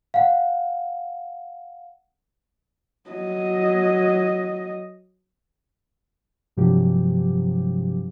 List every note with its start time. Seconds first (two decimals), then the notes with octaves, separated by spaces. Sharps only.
0.14 F5 F#5
3.10 F#3 D#5
6.57 G2 C3 F3 F#3 G#3 G4